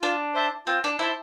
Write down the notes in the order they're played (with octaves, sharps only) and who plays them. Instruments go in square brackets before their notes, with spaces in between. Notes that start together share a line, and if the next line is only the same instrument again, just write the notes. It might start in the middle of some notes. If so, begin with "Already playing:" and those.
[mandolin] D4 [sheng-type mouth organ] F4
[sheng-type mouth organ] C5 E5 A5
[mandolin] C4 [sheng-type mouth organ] F4
[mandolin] D4
[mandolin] E4 [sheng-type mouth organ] C5 E5 A5